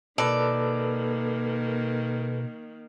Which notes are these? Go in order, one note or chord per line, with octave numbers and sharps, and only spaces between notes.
B2 D#3 A#3 A4 B4 D5